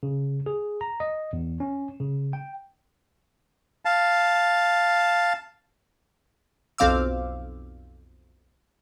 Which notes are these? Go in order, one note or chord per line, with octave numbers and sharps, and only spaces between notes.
C#3
G#4
A#5
D#5
E2
C#4
C#3
G5
F5 A5
B1 F2 C4 F5 D6 E6